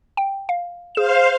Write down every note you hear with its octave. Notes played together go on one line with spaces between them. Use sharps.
G5
F5
G#4 C5 F5 E7